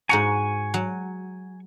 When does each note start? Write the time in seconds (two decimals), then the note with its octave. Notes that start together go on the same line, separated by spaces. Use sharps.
0.09 G#2 F#4 G#5 A#5 C#6
0.74 F#3